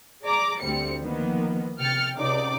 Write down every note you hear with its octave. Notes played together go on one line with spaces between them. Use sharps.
G#4 D5 A#5 D6
D2 G3 C4 C#7
D#3 F3 A#3 B3
C3 G5 F6 A6 C#7
C#2 C3 D#4 D5 D6